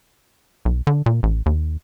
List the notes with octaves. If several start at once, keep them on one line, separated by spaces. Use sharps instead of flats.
B1
D3
A#2
A1
D#2